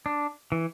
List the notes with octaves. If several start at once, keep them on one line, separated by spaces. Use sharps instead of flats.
D4
E3